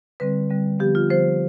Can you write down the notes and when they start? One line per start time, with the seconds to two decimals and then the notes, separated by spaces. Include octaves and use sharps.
0.20 D3 G3 C4 B4
0.50 D3 G3 C4
0.79 D3 F3 B3 G4
0.95 F4
1.09 D3 F3 B3 C5